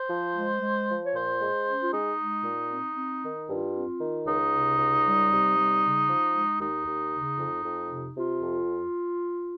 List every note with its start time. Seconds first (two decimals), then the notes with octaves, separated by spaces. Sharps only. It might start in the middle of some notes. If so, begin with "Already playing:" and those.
Already playing: C5
0.10 F3
0.36 G#3
0.62 G#3
0.88 F3
1.04 C#5
1.13 A#2 C5
1.39 G#3
1.66 C#4
1.80 F4
1.92 G#3 D#4
2.17 G#3
2.44 A#2
2.70 C4
2.96 C4
3.22 D#3
3.47 G2 F4
3.74 C4
3.99 D#3
4.26 C#2 D#4
4.52 C3
4.78 C#2
5.04 G3
5.30 C3
5.56 G3
5.82 C#3
6.08 F3
6.34 G#3
6.59 D#2 D#4
6.86 D#2
7.12 C#3
7.38 F2
7.64 F2
7.90 C3
8.16 C3 F4
8.42 F2